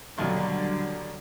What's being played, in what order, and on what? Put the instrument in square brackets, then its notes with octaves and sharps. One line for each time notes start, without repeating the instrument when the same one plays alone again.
[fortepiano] A#1 D#2 B2 [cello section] D3 F#3 G3